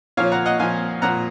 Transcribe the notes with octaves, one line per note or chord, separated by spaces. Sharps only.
A#2 F3 C#5 F5
F#5 A#5
D#5 F#5
A#2 F3 F5 G#5
A#2 F3 F#5 A#5